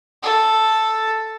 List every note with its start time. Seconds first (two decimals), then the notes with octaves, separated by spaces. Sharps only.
0.23 A4